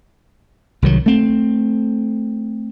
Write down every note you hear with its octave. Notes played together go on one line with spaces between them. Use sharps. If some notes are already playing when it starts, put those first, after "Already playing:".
C2 D#3 F#3
A3 C4